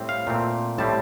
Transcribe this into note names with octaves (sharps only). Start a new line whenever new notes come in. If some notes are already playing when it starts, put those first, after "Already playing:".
Already playing: A2 G3 C4
F5
A#2 A3 C4
A2 G3 C4 A5